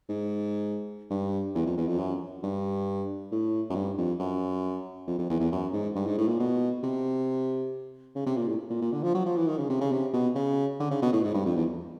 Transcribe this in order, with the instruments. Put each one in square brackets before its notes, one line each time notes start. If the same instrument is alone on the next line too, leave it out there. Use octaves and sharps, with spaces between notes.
[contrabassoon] G#2
G2
E2
F2
E2
F2
F#2
G2
A2
F#2
G2
F2
F#2
F2
F2
E2
E2
F#2
G#2
G2
G#2
A2
A#2
B2
C3
C#3
C3
A#2
A2
A#2
A#2
D3
F3
F#3
F3
E3
D#3
C#3
C3
C#3
C3
B2
C#3
D3
C#3
B2
A2
G#2
G2
F2
E2